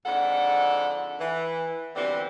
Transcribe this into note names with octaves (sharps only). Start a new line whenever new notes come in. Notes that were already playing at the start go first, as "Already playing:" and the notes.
F2 G#2 D3 A4 F#5
E3
B2 D3 E3 G3 C4